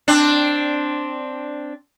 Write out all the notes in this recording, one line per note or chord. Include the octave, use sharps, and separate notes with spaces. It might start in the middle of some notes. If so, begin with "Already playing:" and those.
C4 D4